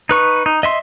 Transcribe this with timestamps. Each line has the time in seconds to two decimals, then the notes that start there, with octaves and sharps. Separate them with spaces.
0.09 D#4 B4 C#6
0.46 D#4
0.63 D#5 E5 C6